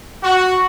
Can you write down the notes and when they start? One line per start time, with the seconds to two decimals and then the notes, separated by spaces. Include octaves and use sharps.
0.24 F#4